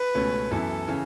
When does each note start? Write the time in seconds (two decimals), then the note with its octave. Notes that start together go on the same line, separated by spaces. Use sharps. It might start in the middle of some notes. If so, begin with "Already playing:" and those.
Already playing: B4
0.15 C#2 B2 A3 C#4
0.51 F#2 E3 B3 E4 A4
0.88 C#3 E3 C#4